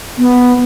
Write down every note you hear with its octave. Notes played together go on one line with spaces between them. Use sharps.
B3